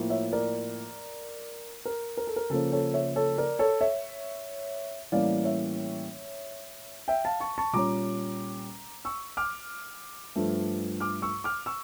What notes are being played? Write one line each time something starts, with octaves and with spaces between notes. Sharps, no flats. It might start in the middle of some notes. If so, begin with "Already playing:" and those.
Already playing: A2 F3 A#3
C#5 E5
A#4 D5
A#4
A#4
A4
A#4
C#3 F3 A#3 C#4 A4
A4 C#5
C#5 E5
A4 C#5
A#4 D5
A4 C#5
C#5 E5
A2 E3 G3 A#3 C#4 D5 F5
C#5 E5
E5 G5
F5 A5
A5 C#6
A5 C#6
A#2 G3 C#4 A#5 D6
C#6 E6
D6 F6
G2 F3 A3
D6 F6
C#6 E6
D6 F6
C#6 E6